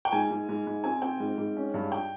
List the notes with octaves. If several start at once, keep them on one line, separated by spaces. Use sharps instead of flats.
G5
G#2 G#5
G#2
G#2
G#2
C4 G#5
C4 G5
G#2
G#2
C#4
G2
G5